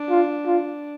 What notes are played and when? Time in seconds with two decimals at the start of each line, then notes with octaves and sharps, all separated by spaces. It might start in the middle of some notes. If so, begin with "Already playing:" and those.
Already playing: D4
0.10 F4
0.46 F4